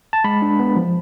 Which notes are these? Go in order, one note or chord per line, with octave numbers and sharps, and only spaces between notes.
A5
G#3 B5
D4
B3
F3